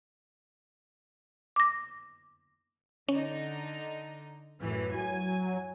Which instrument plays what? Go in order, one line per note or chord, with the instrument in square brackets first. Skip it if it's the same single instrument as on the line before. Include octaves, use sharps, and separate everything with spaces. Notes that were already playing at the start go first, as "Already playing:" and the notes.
[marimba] D6 A#6
[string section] D3 D#4 [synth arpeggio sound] C#4
[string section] F#2 A2 E3
[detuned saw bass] F#3 [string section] G#5